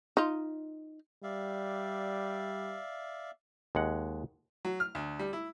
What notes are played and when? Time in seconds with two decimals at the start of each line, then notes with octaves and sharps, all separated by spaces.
0.17 D#4 F4
1.23 G3 D5 E5 F5
3.75 D#2 G#3 F#5
4.65 F#3
4.80 F6
4.95 D2
5.19 G3
5.33 E4